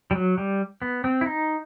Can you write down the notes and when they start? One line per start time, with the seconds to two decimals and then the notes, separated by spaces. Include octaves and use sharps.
0.11 G3
0.15 F#3
0.38 G3
0.82 B3
1.04 C4
1.21 E4
1.26 D#4